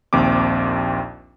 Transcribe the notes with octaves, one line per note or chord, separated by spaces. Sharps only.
A#1 D#2 C4 D6